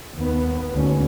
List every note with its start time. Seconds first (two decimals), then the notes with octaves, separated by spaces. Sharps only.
0.15 D#2 B3
0.73 D2 G#2 C#4